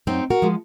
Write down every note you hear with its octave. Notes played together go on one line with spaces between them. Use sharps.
F#2 C4 D#4
F#4 A#4
F3 G#3